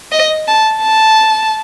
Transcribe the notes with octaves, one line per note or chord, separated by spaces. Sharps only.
D#5
A5
A5